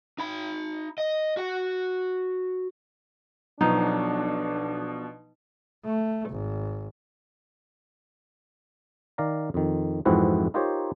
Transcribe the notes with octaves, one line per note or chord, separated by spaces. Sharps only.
D#4 B5
D#5
F#4 F#5
B1 B2 F3 F#3 D4 D#4
A3
G#1
D#3 D5 F5 A#5
F2 D#3
F2 G#2 E3 C4 E4 F#4
D#4 F4 G4 A#4 C5 C#5